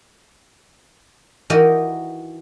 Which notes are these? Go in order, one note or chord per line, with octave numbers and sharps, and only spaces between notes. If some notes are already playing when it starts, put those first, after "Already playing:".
E3 D#4 F#4 G4 A#4 D#5